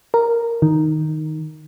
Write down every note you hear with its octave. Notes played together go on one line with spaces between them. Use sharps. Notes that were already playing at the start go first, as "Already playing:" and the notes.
A#4
D#3